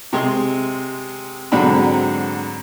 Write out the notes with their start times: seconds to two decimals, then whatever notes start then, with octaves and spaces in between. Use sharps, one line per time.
0.13 C3 G#3 G#4 C6
1.52 G#2 D3 F#3 C4 B5